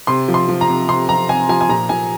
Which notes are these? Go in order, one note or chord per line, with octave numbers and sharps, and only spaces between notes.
C3 C6
F3
C6
F3
A#5
C3
C3 C6
F3 A#5
C3 G#5
F3 G#5
G#5
A#2 A#5
A#2 G#5